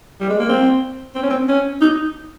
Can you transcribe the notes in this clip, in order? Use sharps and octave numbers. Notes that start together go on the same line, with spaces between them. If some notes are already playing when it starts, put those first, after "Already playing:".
G3
G#3
A#3
C4
C4
C#4
C4
C#4
D#4